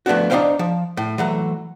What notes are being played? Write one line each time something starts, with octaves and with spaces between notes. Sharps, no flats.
F3 A3 B3 D4 F#4
D4 D#4 F4 C5 F5 G5
F3
A2
E3 F#3 A3